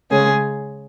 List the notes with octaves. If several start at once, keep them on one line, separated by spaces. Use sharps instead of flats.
C#3 G#3 C#4 G#4